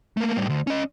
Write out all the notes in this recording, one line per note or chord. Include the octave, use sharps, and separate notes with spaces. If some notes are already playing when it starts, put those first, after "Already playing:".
A3 A#3
A2 G3
D2
C#4 D#5